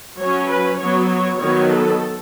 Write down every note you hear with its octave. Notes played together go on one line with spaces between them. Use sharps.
F#3 C#4 C#5
B4
F#3 B3 C#5
C#5
D#3 F#3 B3 C#5
A4